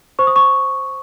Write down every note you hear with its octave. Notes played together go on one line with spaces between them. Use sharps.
C5 C#6
D#6
C#6